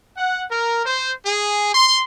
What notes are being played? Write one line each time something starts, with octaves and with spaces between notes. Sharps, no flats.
F#5
A#4
C5
G#4
C6